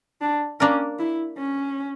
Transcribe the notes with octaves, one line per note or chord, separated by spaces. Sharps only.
D4
A#3 C#4 D4 A#4
E4
C#4